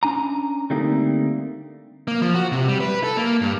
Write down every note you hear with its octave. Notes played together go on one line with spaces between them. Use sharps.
C#4 D4 G#5 A#5
D3 G3 A3 A#3 C4 D#4
A#3
F3
F#4
C3
G3
B4
A4
A#3
G2